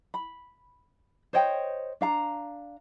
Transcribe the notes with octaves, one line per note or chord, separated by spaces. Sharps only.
B5
C5 C#5 D#5 G5
D4 F5 A#5